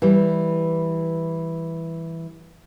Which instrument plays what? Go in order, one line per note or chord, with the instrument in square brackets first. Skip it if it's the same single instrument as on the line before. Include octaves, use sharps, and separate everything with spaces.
[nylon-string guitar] E3 G3